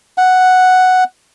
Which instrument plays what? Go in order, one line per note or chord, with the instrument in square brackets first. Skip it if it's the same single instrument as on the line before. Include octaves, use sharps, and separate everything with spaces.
[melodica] F#5